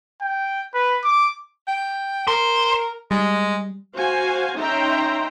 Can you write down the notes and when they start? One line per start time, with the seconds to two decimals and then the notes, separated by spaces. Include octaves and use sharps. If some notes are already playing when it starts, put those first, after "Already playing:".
0.22 G5
0.74 B4
1.04 D6
1.68 G5
2.27 A#4 C5
3.11 G3 G#3
3.94 F#4 C5 F5 G#5
4.56 C#4 D#4 E5 G5 A#5 C6